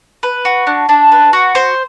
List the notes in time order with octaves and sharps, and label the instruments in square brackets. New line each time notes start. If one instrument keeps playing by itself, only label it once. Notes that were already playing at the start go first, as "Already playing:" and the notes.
[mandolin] B4
F#4
D4
D4
B4
F#4
C5